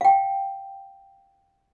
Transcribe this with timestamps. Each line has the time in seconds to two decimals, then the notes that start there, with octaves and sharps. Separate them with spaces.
0.01 F5 G5